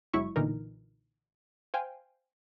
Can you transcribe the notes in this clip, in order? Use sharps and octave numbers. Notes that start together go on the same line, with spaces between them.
G1 F#3 G#3 E4 E5 C#6
B1 A#2 D3 E3 D#4 A#4
C5 F5 G5 G#5